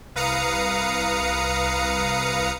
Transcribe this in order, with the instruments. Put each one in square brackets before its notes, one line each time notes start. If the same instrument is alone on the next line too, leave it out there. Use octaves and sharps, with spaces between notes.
[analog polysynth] C2 B4 F5 A#5 D#6 C#7